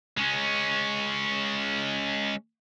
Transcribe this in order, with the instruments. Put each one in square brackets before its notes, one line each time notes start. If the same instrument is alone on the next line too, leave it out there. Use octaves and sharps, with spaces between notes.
[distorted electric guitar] G#3 C#4